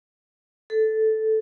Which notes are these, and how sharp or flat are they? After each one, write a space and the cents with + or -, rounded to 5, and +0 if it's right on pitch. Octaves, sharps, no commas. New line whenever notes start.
A4 -5